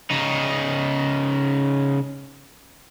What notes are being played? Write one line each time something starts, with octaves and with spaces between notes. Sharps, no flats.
C#3 D#4